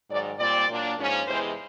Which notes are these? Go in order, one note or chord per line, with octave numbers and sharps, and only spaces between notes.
G#2 D#3 F#3 D5
A#2 G3 C4 D5
A#2 F#3 A#3 D4
G#2 F3 A#3 C#4
E2 C3 E3 G#3 C5